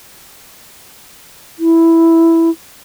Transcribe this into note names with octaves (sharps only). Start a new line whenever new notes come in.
E4